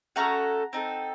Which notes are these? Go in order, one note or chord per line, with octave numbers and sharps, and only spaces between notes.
A3 C#4 F#4 A4 F#5 A#5
C4 D#4 A4